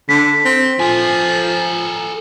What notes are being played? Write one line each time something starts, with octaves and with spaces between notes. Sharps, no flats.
D3 B6
C4
F3 A4 G#5